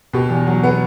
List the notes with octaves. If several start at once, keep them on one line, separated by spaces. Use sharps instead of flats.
B2 G4
E2
F#3
B3